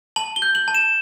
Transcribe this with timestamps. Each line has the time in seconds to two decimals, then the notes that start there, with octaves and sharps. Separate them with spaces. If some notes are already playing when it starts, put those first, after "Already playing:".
0.16 A5 F#7
0.36 G7
0.42 G6
0.55 F#7
0.68 A5
0.74 E7